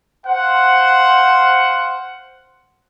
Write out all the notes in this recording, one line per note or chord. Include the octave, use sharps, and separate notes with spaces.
C5 F5 F#5